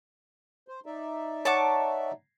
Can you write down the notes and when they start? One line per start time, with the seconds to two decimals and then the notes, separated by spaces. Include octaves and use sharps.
0.68 C5
0.86 D#4 D5 E5
1.45 C#5 F#5 A5 C#6 D6